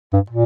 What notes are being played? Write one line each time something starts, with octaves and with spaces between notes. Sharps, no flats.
G2
A#2